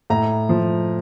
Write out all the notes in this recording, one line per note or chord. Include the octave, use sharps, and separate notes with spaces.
A2 A#5
F3